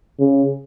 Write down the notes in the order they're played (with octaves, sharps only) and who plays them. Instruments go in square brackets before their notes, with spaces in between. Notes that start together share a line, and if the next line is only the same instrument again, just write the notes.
[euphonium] C#3